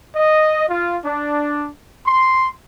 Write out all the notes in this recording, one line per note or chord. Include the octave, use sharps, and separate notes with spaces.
D#5
F4
D4
C6